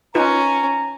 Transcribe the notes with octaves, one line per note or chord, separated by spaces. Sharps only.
C#4 D#4 F4 B4 A#5